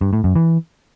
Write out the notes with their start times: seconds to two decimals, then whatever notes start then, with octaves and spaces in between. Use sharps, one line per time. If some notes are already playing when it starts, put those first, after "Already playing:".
0.01 G2
0.13 A2
0.24 F#2
0.36 E3